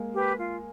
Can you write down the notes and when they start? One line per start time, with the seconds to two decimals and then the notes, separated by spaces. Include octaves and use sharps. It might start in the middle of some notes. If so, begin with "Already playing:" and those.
Already playing: G#3 A#3
0.15 G4 B4
0.38 F4